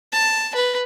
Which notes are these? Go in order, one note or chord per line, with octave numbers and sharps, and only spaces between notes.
A5
B4